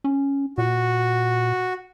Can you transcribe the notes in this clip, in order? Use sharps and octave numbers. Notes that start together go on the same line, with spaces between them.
C#4
A#2 F#4